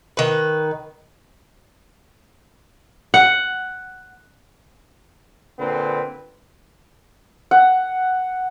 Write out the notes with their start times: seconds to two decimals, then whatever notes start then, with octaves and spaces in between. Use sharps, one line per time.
0.17 D#3 B4
3.14 F#5
5.59 A#2 D3 C4 B4
7.51 F#5